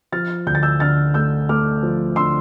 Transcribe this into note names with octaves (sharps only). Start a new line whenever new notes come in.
F3 F6 A6
D2 G6
A6
E6 G6
D3 F6 A6
A3 E6 G6
A3 D6 F6
F3
D3 C6 E6